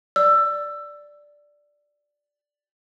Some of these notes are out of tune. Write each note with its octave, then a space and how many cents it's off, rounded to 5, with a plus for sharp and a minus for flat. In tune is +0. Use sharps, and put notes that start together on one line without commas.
D5 +0 E6 +20